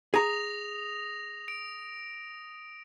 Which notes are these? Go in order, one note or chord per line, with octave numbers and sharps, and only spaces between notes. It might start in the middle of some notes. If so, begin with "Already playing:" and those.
G#4 A#5 D#6 A#6 F7
D7